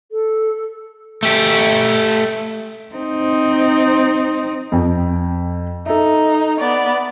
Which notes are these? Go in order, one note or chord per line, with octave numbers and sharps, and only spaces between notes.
A4
A3 G4
C4 D#4
F2 G5
D#4 A4 E5
B3 D5